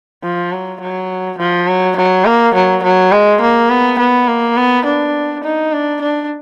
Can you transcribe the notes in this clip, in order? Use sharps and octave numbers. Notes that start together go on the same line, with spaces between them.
F3
F#3
F#3
F3
F#3
F#3
A#3
F#3
F#3
G#3
A#3
B3
B3
A#3
B3
D4
D#4
D4
D4